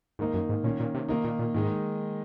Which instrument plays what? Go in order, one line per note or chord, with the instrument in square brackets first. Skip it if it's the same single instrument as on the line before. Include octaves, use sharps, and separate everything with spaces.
[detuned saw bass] G#2 [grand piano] D#3 A#3 D#4
[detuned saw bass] F#2
G#2
[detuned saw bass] A#2 [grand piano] D#3 A#3 C#4
[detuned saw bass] A#2
C3
[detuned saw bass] C3 [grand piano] D#3 A#3 D#4
[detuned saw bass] A#2
A#2
[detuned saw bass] G#2 [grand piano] D#3 G#3 D#4